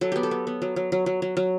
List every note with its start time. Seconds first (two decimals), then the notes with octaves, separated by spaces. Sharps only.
0.01 F#3 A4
0.12 B3 G4
0.23 A4
0.31 B3
0.47 B3
0.62 F#3
0.76 F#3
0.92 F#3
1.06 F#3
1.22 F#3
1.37 F#3